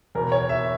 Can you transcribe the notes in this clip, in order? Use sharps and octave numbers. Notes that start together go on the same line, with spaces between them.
E2 B2 A#4
C#5
E5